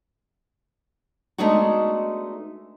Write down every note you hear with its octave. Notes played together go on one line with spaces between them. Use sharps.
G#3 A3 B3 D4 D#4 F#4